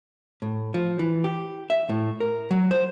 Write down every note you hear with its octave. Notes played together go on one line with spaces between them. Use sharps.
A2
F3
E3
G4
E5
A2
A#4
F#3
C5